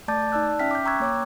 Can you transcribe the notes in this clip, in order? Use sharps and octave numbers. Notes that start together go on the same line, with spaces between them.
A3 D5 A5 D6 G6 A6
D#4 D5 A5 E6 F#6
C#4 E5 G5 F6 B6
D6 G6
G5 A#5 C#6 E6 F#6 G#6
A#3 C#5 D6